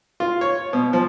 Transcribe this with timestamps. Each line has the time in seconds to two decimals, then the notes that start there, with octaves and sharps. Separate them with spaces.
0.20 F4
0.41 C#5
0.73 B2
0.93 F3